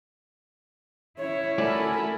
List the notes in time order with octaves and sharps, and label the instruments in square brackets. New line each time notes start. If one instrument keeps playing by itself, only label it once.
[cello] C#4 E4 [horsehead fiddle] C#5
[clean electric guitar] A3 F#4 D5 [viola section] A4 A#4 [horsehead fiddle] G#5 B5